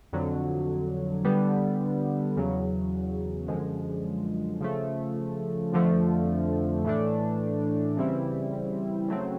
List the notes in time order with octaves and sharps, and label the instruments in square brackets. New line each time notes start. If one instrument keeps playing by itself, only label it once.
[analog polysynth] F2 D3 F#3
D3 G3 B3
E2 C#3 F#3
F#2 D3 F3 G#3
C#3 F3 A3
F2 D3 F3 A3
A2 E3 A3 D4
C#3 E3 G3 C4 E4
C#3 F#3 A3 C4